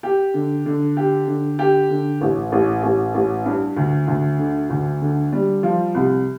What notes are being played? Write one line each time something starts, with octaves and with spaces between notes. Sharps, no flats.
G4
D3
D3
G4
D3
G4
D3
A1
A1
A1
A1
G2
D2
D2
D3
D2
D3
G3
F3
C2